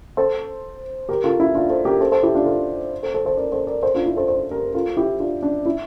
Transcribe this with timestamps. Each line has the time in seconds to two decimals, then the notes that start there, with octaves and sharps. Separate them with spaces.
0.17 A4 C5
1.09 G4 A#4
1.24 F4 A4
1.40 E4
1.54 D4 F4
1.70 A4 C5
1.85 G4 A#4
2.01 A4 C5
2.12 A4 C5
2.23 E4 G4
2.34 D4 F4
2.46 F4 A4
3.03 A4 C5
3.14 A4 C5
3.26 A4 C5
3.37 A#4 D5
3.52 A4 C5
3.67 A#4 D5
3.83 A4 C5
3.94 D4 F4
4.06 E4
4.17 A4 C5
4.28 A4 C5
4.51 G4 A#4
4.74 F4 A4
4.97 E4 G4
5.20 D4 F4
5.43 D4
5.66 E4